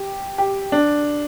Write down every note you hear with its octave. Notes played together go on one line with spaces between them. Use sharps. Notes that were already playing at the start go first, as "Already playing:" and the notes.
Already playing: G4
G4
D4